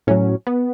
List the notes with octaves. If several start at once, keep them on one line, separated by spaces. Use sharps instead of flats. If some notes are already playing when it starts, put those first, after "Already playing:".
A2 F#3 C#4
B3